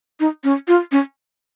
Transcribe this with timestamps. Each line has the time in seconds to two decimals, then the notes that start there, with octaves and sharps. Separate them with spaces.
0.20 D#4
0.44 C#4
0.68 F4
0.92 C#4